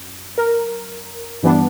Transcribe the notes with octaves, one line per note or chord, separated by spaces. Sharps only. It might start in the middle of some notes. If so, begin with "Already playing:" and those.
Already playing: F#2
A#4
G2 E3 B3 D4